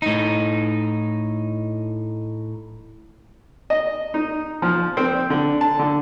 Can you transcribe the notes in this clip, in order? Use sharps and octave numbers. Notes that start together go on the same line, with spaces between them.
A2 D#4
D#5
D#4
F3
C4
D3
A5
D3